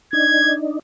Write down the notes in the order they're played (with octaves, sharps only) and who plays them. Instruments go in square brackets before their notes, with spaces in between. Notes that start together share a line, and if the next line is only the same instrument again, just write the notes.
[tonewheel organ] D4 D#4 [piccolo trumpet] G#6